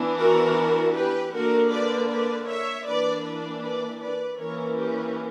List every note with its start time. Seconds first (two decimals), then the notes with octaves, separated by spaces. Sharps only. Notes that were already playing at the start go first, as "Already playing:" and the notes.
Already playing: E3 B3 D4
0.17 F#4 A#4
0.94 G4 B4
1.32 D3 A#3 D4 F#4 A#4
1.71 B4 D5
2.09 B4 D5
2.47 C#5 E5
2.86 E3 A#3 D4 B4 D5
3.24 B4 D5
3.62 B4 D5
4.00 B4 D5
4.39 E3 A#3 C#4 A#4 C#5
4.77 G4 B4